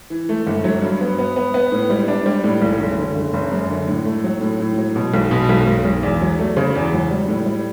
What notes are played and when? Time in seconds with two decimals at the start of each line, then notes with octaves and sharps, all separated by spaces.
0.10 E3
0.29 A3
0.47 G1
0.64 F#3
0.82 G2
1.01 B3
1.19 B3
1.36 B3
1.54 B3
1.72 A2
1.90 G3
2.08 D4
2.26 G3
2.44 A2
2.62 B1
2.80 F#1
2.98 D3
3.15 F#1
3.34 F#1
3.52 F#2
3.70 D3
3.87 A2
4.05 A3
4.24 F#3
4.41 A2
4.60 A2
4.78 F#3
4.96 B2
5.14 B1
5.31 B2
5.49 B1
5.67 B1
5.85 B1
6.03 E2
6.22 F#3
6.39 A3
6.57 C#3
6.75 E2
6.93 F#3
7.11 G3
7.28 A2
7.46 G3